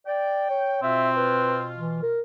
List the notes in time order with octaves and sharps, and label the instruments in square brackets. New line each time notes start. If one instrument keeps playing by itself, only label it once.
[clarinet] D5 [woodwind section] G5
[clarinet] C#5
[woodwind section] B2 F4 [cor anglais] C4 [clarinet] E5
[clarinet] B4
E3
A#4